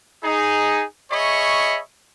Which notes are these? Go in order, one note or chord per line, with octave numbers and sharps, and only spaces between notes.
D#4 G#4
G#4 C#5 D#5 E5 B5 C#6